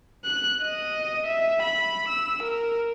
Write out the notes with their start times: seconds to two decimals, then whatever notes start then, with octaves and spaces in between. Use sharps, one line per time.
0.25 F#6
0.64 D#5
1.26 E5
1.63 B5
2.08 E6
2.43 A#4